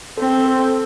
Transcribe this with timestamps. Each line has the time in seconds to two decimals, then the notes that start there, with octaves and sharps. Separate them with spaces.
0.18 C4 A4
0.46 A4